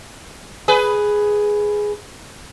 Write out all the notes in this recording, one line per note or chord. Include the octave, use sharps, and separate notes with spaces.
G#4 B4